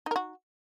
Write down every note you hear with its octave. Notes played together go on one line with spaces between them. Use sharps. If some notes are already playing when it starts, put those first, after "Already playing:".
D#4 F#4 A#4